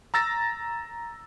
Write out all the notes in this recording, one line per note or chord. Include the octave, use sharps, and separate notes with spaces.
A#5 E6 A6 A#6